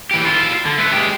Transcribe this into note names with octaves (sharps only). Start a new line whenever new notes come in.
E3 G4
E4 F4
D3
A3 B3
G#3 G4